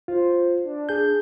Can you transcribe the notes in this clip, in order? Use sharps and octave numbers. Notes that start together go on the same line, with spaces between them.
F4 C5
D4
G#4 G6